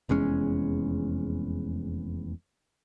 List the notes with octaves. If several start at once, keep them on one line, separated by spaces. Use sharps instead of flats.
F1 E2 G#3 C#4